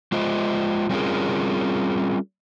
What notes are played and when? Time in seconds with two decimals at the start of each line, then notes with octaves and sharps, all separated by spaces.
0.12 G#3 F4 C5 D#5
0.90 G3 C4 C#4 F4 G#4 A#4